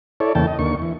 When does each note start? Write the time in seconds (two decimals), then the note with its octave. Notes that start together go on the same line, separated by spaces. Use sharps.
0.20 E4 A4 C#5 D5
0.35 E2 C#3 E3 A#3 G5 A5
0.47 D#5
0.59 D#2 D3 A#3 C#6
0.82 E3